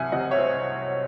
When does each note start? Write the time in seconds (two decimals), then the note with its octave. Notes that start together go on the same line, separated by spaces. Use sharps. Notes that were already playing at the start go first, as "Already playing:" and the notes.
Already playing: C2 F#3 E5 F#5 G#5
0.12 C3 D#5 F#5
0.31 C#5 E5
0.38 C4